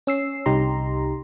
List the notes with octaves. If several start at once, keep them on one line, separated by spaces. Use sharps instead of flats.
C#4 E6 C7
C2 D#4 G4 A#5 C6